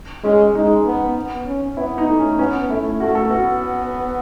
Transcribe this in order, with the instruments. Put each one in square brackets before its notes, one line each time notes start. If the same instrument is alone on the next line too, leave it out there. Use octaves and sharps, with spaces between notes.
[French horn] G#3 [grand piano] C#4
[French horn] G#3 [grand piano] D#4
[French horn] B3
B3
C#4
[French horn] B3 [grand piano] E4
[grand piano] D#4
[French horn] A3
[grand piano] C#4
[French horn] B3 [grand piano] C#4
[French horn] A3 [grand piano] E4
[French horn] A3 [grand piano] F#4
[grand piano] A4
[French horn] B3 [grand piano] F#4